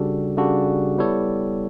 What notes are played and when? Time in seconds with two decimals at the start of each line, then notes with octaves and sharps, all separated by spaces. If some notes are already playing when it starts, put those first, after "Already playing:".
Already playing: C#3 G3 D4 F#4 A4
0.37 C#3 G3 D4 F#4 A4
0.98 G3 B3 E4 A4 C#5